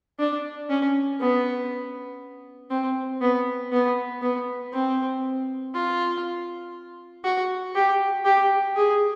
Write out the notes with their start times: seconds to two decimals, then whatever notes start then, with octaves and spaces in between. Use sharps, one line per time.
0.19 D4
0.70 C#4
1.21 B3
2.71 C4
3.22 B3
3.73 B3
4.22 B3
4.73 C4
5.74 F4
7.24 F#4
7.75 G4
8.25 G4
8.76 G#4